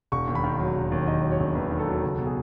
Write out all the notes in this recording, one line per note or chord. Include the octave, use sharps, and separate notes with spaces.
E1 C#6
D#2
B5
D#3
F#3
E1
D#2
D#3 D#5
F#3
C#5
E1
D#2 B4
D#3
A4
F#3
C#2 A4
B2
G#4